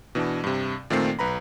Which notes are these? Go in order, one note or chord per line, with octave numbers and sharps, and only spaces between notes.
B2 E3 D4
G2 C3
A#2 D#3 A3 C4 C7
B1 B4 A#5 B5